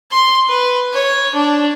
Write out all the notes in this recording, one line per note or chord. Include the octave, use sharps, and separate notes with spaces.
C6
B4
C#5
D4